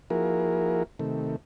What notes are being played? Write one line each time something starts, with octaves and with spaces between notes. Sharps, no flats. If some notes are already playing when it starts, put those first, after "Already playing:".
F3 A#3 E4 F#4 G#4 A#4
C3 D#3 A3